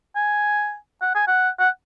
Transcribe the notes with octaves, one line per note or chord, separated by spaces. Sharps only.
G#5
F#5
G#5
F#5
F#5